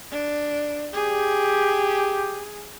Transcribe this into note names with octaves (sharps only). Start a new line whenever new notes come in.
D4
G4 G#4